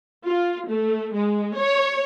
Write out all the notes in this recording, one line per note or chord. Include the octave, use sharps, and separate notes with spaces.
F4
A3
G#3
C#5